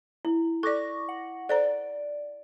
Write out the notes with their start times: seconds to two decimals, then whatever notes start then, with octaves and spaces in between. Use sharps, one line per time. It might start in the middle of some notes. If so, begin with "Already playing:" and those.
0.25 E4
0.63 A4 D5 C#6 D6 A#6
1.09 F#5
1.49 A4 C5 D5 A#5